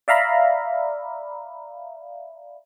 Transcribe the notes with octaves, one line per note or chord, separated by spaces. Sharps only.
D5 E5 F5 A#5 B5